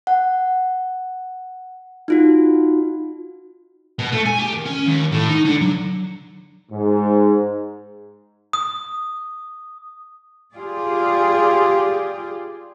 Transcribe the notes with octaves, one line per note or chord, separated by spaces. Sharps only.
F#5
D#4 F4 F#4
B2
A3
G#5
G4
D#3
C#4
D#2
A2
D#4
D3
F#3
G#2
D#6
F4 G4 G#4 D5